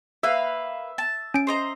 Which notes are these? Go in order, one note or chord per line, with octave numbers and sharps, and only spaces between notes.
A#3 B4 E5 F5
A5
C#4 D7
C5 D#5 A#5